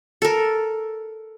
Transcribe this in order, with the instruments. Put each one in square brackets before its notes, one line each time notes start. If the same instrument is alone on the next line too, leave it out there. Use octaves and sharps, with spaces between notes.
[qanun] A4 A#4